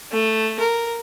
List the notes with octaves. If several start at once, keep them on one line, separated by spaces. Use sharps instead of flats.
A3
A#4